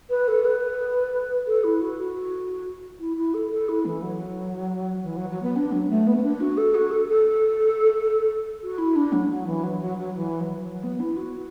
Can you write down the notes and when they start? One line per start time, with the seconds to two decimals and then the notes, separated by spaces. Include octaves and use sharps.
0.10 B4
0.28 A4
0.44 B4
1.47 A4
1.64 E4
1.81 F#4
1.98 F#4
2.99 E4
3.16 E4
3.34 A4
3.51 A4
3.68 E4
3.85 E3
4.02 F#3
5.03 E3
5.16 F#3
5.30 F#3
5.42 B3
5.56 D4
5.72 F#3
5.90 A3
6.07 B3
6.17 B3
6.23 D4
6.40 F#4
6.57 A4
6.74 F#4
6.91 A4
7.08 A4
8.62 F#4
8.78 E4
8.95 D4
9.12 F#3
9.29 F#3
9.46 E3
9.63 F#3
9.81 F#3
9.98 F#3
10.15 E3
10.40 F#3
10.55 E3
10.65 F#3
10.83 B3
10.99 E4
11.16 F#4